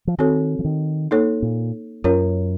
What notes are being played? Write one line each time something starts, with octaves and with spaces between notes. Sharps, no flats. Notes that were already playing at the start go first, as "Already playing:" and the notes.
F3
D#3 C4 F#4 A4 C#5
F3
D#3
A#3 D#4 A4 C#5
A#2
F#2 C#4 F4 A#4 C#5